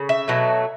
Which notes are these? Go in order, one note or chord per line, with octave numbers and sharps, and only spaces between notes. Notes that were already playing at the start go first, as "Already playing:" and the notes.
Already playing: C#3
E5
B2 F#3 A3